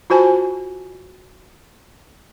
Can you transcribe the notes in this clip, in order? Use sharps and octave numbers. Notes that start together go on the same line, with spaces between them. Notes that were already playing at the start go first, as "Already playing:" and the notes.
F4 F#4 C5 G#5 A5